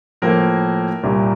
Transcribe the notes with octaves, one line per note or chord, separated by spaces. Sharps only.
A2 F3 A#3 A#4
C2 A#2 G3